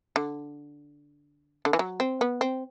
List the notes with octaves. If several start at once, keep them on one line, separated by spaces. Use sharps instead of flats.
D3
D3
E3
F#3
C4
B3
C4